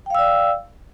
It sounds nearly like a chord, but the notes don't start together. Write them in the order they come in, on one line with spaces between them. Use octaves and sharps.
G5 F5 E6 D5